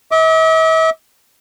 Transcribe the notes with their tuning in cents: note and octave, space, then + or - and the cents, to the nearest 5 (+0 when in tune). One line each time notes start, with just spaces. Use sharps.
E5 -45 D6 +0